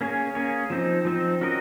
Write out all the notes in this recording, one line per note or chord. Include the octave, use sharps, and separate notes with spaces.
A#3 C#4 G#4 C#5
A#3 C#4 G#4 C#5
F3 C4 D#4
F3 C4 D#4
C#4 F#4 A#4 D#5